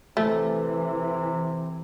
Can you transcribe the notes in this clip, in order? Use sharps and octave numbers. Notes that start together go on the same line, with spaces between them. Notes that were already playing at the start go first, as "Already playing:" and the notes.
C3 E3 A3